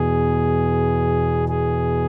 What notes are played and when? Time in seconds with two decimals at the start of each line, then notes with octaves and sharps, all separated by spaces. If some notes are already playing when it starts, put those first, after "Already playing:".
Already playing: E2 B2 G#4
1.48 G#4